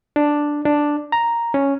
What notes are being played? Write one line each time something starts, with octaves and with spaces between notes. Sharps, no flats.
D4
D4
A#5
C#4